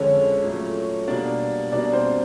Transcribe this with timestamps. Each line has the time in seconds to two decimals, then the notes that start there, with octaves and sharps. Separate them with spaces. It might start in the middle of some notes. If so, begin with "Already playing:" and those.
Already playing: F2 D3 F3 G#3 C#4 C#5
0.43 A#2 F#3 A3
1.08 B2 G3 A#3 D4 D5
1.72 B2 G3 A#3 D4 D5
1.93 C4 C5